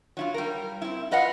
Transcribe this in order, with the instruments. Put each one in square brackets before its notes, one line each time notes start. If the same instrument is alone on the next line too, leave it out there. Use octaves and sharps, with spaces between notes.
[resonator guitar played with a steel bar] F#3 E4 F4
G3 A#4
C4 E4
F4 B4 D#5 F5 F#5